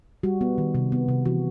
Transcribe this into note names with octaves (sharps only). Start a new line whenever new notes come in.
G3 F#4
B3
D#3
C3
B3
C3
E3 F#4